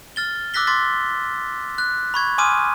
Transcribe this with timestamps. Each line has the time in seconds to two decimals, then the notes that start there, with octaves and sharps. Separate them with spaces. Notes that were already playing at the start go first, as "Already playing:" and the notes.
0.16 F6 A6 G7
0.54 D6 E6 F#6 A#6 B6 G7
0.67 C6 D6 A6 B6
1.78 F#6
2.14 B5 C#6 G#6
2.38 G#5 C6 D6 D#6 F6 D#7